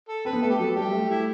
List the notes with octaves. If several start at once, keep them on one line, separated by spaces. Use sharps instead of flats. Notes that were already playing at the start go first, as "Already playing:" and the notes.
A4
C4 B4
B3
A3 A4
G4
F#3 A4
G3 G4
A3
E4